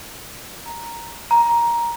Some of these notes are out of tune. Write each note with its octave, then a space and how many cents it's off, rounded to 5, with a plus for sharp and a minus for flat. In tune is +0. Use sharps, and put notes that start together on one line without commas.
A#5 +0
A#5 +10